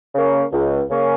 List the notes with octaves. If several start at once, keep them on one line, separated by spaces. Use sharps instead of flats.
C#3 A#3 C#4
C#2
C#3 A#3 C#4